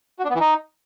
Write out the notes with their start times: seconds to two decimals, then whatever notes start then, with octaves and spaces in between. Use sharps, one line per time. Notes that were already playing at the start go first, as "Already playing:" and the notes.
0.19 F#4
0.24 D4
0.30 B3
0.35 E3
0.40 D#4